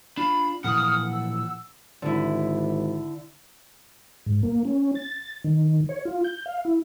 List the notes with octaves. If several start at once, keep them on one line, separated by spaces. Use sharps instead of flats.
D4 F4 B5
A#2 E3 F3 F#5 D#6 F6
E6
G#1 D3 E4
G#2
A#3
C#4
A6
D#3
C#5
F4
G6
F5
E4